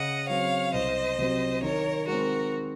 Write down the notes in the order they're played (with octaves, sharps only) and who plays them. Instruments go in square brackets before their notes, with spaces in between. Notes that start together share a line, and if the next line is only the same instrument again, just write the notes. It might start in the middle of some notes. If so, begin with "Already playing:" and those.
Already playing: [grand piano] C#3 [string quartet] D#5 F#5
[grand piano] F#3 C4 [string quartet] C#5 F5
[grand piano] C2 [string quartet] C5 D#5
[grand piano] C3 F#3 C4
[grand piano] D#3 [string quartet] A#4 C#5
[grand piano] G#3 C4 [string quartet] F#4 A#4